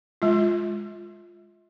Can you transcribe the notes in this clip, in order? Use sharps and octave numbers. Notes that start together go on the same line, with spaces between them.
G#3 F4